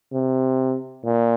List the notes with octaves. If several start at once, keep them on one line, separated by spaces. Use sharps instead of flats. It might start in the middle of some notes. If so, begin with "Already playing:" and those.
C3
A#2